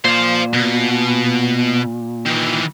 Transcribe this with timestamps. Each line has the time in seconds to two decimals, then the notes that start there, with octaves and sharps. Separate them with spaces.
0.05 A#2 C5 F5
0.54 B2
2.26 D#3 E3